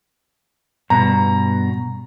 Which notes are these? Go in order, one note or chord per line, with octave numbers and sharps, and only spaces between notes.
G2 B2 A#5